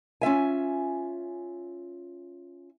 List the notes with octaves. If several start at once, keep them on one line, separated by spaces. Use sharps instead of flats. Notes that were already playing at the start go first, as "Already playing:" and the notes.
C#4 F4 E5 G#5